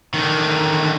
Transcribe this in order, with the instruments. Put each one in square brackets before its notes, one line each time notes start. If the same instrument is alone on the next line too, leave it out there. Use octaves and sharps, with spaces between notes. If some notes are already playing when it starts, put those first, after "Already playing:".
[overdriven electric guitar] D3 D#3